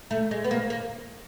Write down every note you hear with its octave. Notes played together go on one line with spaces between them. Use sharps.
A3
G#3
B3
A#3
A#3